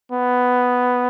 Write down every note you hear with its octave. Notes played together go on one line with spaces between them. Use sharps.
B3